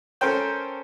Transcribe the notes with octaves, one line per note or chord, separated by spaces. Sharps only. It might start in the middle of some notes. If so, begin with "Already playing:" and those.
C#4 A4 A#4 C5 G5